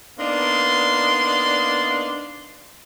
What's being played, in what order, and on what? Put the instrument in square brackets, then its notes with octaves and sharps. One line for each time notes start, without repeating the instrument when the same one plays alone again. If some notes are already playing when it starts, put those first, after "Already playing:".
[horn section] A#3 B3 D4 D#4 D5 C6